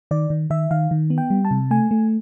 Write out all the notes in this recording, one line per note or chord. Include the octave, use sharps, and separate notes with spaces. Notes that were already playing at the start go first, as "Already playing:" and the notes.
D#3 D5
D#3
D#3 E5
D#3 F5
D#3
B3
G5
G3
A5
C3
A3 G#5
A3